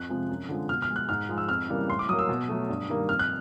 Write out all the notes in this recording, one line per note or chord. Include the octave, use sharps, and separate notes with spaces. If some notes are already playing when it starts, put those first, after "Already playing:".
Already playing: F2 F#6
C3 F3 G#3
F#2
D3 F3 G#3
B2 F6
F6
G#3
F#6
G#2 F6
F3 G#3
E6
F2 F6
C#3 E3 G3 A#3
A2 C6
D6
F#3 A#3 D#6
E6
B2
F#3 A3
G2
D#3 G3 A#3
F2 F6
F#6